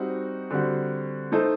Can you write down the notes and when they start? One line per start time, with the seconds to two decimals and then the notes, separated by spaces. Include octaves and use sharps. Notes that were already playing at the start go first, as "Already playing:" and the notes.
Already playing: G3 C4 D#4 F#4
0.51 D3 G3 C4 F#4
1.32 A3 D#4 A4 C5